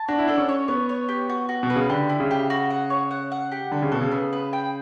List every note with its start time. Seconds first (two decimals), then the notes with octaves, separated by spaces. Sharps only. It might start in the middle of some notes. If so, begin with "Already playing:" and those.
Already playing: A5
0.08 D4 F#4
0.19 E4
0.28 D4 A4
0.38 C#4
0.49 C#5
0.68 B3 C#5
0.89 C#5
1.09 G4
1.29 F#4
1.49 F#4
1.63 B2
1.70 B4
1.76 C#3
1.90 D3 G4
2.09 E4
2.20 C#3
2.31 G4
2.50 F#4
2.70 F#5
2.90 C#5
3.11 F#5
3.32 F#5
3.52 G4
3.72 D3 A4
3.82 C#3
3.91 B2 A4
4.01 C#3
4.12 B3
4.33 B4
4.53 G5